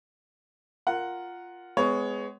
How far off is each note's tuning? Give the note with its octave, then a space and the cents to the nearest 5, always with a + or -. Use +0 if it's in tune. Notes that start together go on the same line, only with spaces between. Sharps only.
F4 +0 A#4 +0 F#5 +0
G#3 +0 B3 +30 C#5 +10